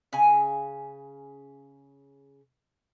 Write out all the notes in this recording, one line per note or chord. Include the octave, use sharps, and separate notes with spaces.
C#3 G#5